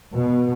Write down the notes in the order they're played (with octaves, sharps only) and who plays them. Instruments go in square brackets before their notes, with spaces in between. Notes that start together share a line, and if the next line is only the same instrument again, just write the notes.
[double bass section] B2